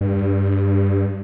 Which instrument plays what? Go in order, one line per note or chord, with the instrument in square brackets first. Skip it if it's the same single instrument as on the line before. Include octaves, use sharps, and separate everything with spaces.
[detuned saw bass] G2